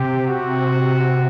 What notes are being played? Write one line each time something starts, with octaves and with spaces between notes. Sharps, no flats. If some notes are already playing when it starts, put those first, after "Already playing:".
Already playing: C3 G4
F#4